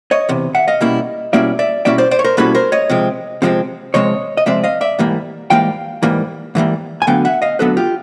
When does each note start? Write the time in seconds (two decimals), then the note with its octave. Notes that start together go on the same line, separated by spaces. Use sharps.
0.11 C#5 D#5
0.29 E2 C3
0.55 E5 F#5
0.68 D#5 F5
0.81 B2 G3 A#3 C#4 E4
1.33 B2 G3 A#3 C#4 E4 D5 E5
1.59 D5 E5
1.85 B2 G3 A#3 C#4 E4 D5 E5
1.98 C5 D5
2.11 C5 D5
2.19 C#5
2.24 A#4 C5
2.37 B2 G3 A#3 C#4 E4 A4 B4
2.55 A#4 C5
2.72 C#5 D#5
2.89 C3 F3 G#3 C4
3.42 C3 F3 G#3 C4
3.94 C3 F3 G#3 C4 C#5 D#5
4.37 D#5
4.46 C3 F3 G#3 C4 D5 E5
4.63 D#5 F5
4.81 D5 E5
4.99 G#2 E3 G3 A#3
5.50 G#2 E3 G3 A#3 F5 G5
6.03 G#2 E3 G3 A#3
6.55 G#2 E3 G3 A#3
7.02 G#5
7.07 D2 D3 F#3 B3 F5 G5
7.25 E5 F#5
7.42 D#5 F5
7.59 D2 D3 F#3 B3 A4 B4
7.77 F4 G4